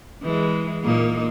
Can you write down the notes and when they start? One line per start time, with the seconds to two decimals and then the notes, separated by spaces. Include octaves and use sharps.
0.22 E3 G#3
0.83 A#2 A#3 D#4